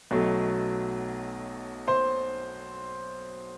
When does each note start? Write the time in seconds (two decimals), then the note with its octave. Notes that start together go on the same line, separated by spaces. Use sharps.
0.11 B1 B2 F#3 A3
1.88 C5 C6